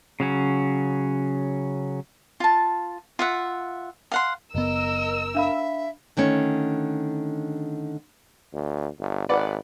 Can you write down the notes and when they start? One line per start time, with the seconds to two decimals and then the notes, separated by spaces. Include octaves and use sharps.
0.20 C#3 F#3 C#4
2.40 F4 A5
3.19 F4 E5 F#5
4.12 F5 F#5 C6
4.55 F#1 B3 A#4 D#5 E6
5.35 D4 E5 F5 B5
6.17 D3 D#3 A3 C#4
8.53 D2
8.99 G1
9.29 G#1 B4 D5 F#5